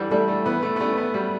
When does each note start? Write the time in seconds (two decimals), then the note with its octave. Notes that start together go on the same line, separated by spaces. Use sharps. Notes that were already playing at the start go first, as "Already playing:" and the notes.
Already playing: D3 E3 G3
0.11 G3 A3 D4 A4
0.28 A3
0.46 E3 B3
0.63 A3
0.76 B3
0.80 G3 A3 C#4 E4
0.97 B3
1.14 F#3 G3